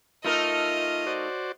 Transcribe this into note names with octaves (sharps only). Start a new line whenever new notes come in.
A3 D#4 F4 A#4 D#5
F#4 C5 D5